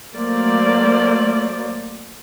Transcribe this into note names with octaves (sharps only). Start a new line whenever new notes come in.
F#3 A3 A#3 C5 D5